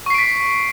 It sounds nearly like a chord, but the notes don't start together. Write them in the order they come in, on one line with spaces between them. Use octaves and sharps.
C#6 C7 D7 B6